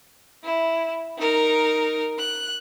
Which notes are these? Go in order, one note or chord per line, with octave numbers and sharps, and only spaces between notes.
E4
D#4 A#4
F#6